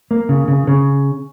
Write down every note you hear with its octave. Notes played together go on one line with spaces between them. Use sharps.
A#3
C#3
C#3
C#3